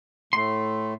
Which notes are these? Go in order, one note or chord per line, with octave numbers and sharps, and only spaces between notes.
A2 A3 C6